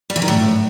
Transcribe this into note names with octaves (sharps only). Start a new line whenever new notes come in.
G3
E3
D#3
A2